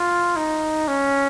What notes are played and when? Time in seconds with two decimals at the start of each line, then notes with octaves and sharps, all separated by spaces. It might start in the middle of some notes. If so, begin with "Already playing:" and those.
Already playing: F4
0.36 D#4
0.88 C#4